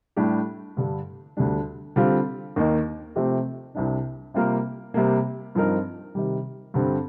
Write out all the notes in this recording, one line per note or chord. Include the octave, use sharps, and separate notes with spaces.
A2 G3 D4 G4
G2 D3 G3 D4 A4
D2 D3 G3 D4
D3 G3 C4 F4
D#2 D#3 A#3 D#4
C3 F3 A3 C4 G4
C2 C3 G3 D4
C3 G3 A#3 F4 A#4
C3 G3 A#3
G2 F3 C4 D#4 A#4
C3 D#3 G3
G2 D3 G3 C4